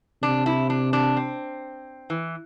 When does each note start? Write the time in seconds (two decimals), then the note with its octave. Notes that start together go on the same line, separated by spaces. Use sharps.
0.22 C3 D4
0.46 E4
0.70 D4
0.93 D4
1.17 C4
2.10 E3